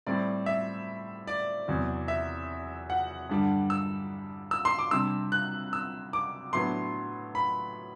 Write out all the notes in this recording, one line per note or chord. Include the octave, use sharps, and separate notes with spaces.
A2 G3 C4 D5
E5
D5
E2 C3 F#3
E5
F#5
G2 D3 G3 D4
E6
E6
C6
D6
C3 G3 D4 E6
F#6
E6
D6
A2 F#3 B3 D4 C6
B5